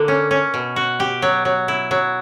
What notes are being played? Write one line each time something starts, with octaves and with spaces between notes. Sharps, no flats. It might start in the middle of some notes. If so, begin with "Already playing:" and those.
Already playing: D3 A#3
C#4
C#4
B2
F#4
G4
F#3
F#3
E4
F#3